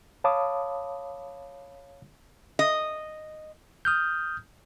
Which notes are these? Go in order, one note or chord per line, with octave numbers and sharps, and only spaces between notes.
C#5 F5 A5 B5 D6 D#6
D#5
D#6 F6 G6